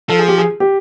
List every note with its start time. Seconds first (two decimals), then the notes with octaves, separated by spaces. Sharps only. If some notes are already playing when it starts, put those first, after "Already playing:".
0.09 F3 A4
0.19 G#4
0.28 G4
0.38 G#4
0.60 G4